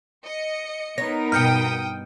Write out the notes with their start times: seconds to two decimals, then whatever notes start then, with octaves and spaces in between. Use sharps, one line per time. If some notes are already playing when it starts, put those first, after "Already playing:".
0.24 D#5 C#7
0.98 B3 D#4 A#4 C#5 A#6
1.32 G2 B2 G5 D#6 F6 G6 C#7